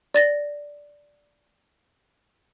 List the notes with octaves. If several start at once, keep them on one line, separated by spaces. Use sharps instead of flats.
D5 A6 A#6